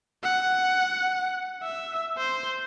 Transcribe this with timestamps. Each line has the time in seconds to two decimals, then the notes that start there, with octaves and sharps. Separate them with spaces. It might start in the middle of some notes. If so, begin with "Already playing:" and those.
0.24 F#5
1.63 E5
2.18 C5